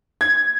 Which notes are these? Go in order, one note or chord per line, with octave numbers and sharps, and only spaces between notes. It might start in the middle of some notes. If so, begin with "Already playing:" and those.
G#6